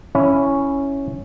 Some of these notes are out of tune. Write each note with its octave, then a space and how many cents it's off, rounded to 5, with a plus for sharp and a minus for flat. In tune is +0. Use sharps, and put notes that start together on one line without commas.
C#4 +0 E4 +0